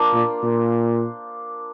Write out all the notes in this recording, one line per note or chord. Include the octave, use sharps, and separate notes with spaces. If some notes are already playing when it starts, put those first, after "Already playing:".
Already playing: A#3 D4 F4 C5
A#2
A#2